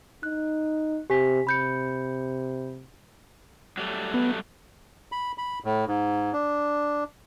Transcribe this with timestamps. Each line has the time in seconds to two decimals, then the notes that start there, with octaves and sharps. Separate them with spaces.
0.23 D#4 F#6
1.10 C3 G4 G#5 B6
1.47 C3 B5 G6 C#7
3.78 F#3 G3 A3
4.14 B3
5.12 B5
5.38 B5
5.64 A2
5.87 G#2
6.33 D4